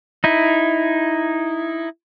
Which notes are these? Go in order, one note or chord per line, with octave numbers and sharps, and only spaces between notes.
D#4 E4